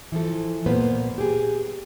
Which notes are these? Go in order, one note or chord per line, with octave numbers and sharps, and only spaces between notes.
E3 F3 A4
A#2 A#3 B3 B4 C5
G4 G#4